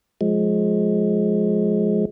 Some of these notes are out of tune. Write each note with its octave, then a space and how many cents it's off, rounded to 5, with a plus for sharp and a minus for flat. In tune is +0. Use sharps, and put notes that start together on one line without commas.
F3 +25 G#3 +20